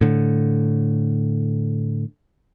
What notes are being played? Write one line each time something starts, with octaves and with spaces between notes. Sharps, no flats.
A2 D3